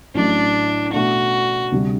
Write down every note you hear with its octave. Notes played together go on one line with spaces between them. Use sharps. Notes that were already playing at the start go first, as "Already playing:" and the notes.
A1 A2 F#3 A3 D4
B2 A3 D4 F#4
D2 C3 G3 D4